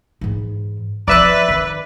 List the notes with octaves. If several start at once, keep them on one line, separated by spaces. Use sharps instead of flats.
G#2 E3
F3 C4 B4 D5 E5 F#6
D#3